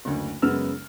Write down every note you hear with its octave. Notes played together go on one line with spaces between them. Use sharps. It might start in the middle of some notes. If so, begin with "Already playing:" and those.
F#1 D2
F#2 C#3 G#3 B3 E6 F6